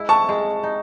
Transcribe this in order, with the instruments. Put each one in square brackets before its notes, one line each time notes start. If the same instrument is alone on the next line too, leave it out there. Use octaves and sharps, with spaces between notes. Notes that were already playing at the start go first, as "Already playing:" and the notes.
Already playing: [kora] G#3 E4
[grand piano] A5 C#6
[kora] G#3
D#4